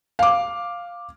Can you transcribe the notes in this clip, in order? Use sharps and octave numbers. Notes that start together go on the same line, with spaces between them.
F5 D6